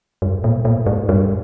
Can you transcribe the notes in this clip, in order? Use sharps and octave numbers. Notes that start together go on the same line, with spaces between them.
G2
A#2
A#2
G#2
G2